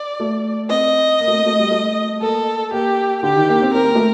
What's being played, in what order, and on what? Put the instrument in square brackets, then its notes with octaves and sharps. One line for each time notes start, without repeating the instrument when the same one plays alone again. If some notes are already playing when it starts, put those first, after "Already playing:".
Already playing: [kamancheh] D5
[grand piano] A3
[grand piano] C4 [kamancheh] D#5
[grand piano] A#3
A3
A#3
A3
G3
A3
[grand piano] A#3 [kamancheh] A4
[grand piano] A#3 [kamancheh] G4
[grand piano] D3 [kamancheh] G4
[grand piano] D#3
A#3
C4
[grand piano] C4 [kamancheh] A#4
[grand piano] A#3
A3